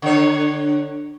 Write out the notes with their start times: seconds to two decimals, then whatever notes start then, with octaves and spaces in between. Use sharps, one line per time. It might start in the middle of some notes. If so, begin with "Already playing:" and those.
0.02 D3 C#5